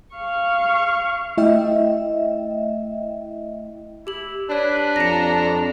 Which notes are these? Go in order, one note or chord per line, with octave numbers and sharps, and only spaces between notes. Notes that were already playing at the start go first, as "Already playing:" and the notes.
F5 C#6
A3 E4 D#5 E5 G5
E4 G4 F#7
D4 G4 B4 C#5
F2 A#5 A#6 C#7